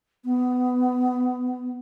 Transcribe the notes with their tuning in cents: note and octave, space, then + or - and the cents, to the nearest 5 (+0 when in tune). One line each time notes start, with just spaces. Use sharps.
B3 +20